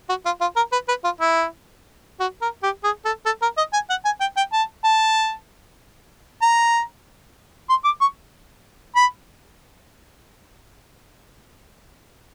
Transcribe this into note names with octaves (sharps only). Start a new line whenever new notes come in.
F#4
F4
F4
A#4
B4
B4
F4
E4
F#4
A#4
G4
G#4
A4
A4
A#4
D#5
G#5
F#5
G#5
G5
G5
A5
A5
A#5
C6
D6
C#6
B5